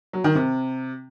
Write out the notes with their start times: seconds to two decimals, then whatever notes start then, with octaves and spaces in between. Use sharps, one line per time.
0.13 F#3
0.24 D#3
0.35 C3